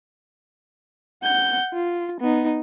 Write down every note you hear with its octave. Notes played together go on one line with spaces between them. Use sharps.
F#5 G6
F4
B3 D#4